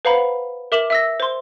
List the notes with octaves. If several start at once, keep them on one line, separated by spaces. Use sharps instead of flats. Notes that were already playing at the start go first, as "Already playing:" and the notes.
B4 C5 F5 F#5 A#5 B5
A#4 E5 D6 E7 F#7
E5 E6 A#6
C5 C6